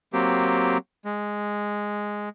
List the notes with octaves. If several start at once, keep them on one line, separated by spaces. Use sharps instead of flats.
F#3 A#3 C4 G4
G#3